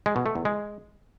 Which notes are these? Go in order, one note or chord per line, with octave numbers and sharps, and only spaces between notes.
G#3
B2
A3
E2
G#3